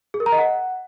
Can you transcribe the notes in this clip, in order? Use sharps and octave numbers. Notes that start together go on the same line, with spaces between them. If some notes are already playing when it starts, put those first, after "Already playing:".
G#4
A#4
A#5
D#5
F#5